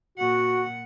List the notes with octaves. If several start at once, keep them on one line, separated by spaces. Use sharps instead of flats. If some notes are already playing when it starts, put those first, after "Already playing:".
A#2 F#4 F#5